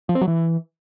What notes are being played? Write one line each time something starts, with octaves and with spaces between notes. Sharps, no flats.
F3
C4
F#3
E3